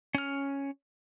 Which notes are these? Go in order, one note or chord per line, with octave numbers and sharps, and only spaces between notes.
C#4 F6